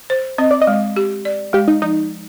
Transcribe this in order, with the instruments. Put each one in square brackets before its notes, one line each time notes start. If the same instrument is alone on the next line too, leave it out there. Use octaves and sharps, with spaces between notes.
[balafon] C5
[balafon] C4 [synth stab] D#5
[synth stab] D5
D#5
[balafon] G#3
G4
D5
[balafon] G#3 [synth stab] G4
[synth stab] D#4
[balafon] F3 [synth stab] D#4